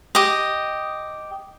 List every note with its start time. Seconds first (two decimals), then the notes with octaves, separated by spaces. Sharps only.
0.15 G4 D#5